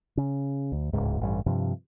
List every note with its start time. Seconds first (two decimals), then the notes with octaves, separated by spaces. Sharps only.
0.17 C#3
0.72 D2
0.93 D1 G1 C#2 G#2
1.21 A1 G2
1.46 G2 C3 F3